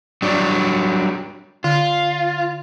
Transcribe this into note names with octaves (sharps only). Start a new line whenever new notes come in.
F#3 G3 D4
D3 F4